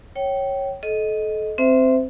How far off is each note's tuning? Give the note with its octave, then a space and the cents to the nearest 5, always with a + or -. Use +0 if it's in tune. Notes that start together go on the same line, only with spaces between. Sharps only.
C#5 -10 G5 -25
A4 -30 D#5 +0
C4 +0 C5 -25 E5 +0